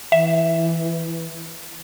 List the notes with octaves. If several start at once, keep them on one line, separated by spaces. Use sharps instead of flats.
E3 E5